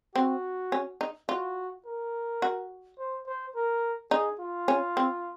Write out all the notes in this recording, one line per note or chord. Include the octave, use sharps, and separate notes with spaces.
C4 F#4
C#4
D#4
F4 F#4
A#4
F#4
C5
C5
A#4
D#4 G#4
F4
C#4
C4